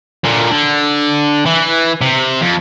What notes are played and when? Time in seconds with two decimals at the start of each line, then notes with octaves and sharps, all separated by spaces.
0.25 A#2 D3
0.51 D3
1.46 E3
2.02 C3
2.41 F2